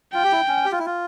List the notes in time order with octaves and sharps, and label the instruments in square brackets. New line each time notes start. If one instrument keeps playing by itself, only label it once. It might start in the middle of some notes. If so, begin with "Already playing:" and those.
[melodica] F4 [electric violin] G5
[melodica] G4
E4
C#4
G4
F4
E4
F4